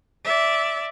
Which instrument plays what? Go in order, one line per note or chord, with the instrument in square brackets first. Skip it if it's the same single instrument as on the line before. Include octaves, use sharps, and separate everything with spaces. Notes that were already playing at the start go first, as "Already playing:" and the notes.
[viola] D5 E5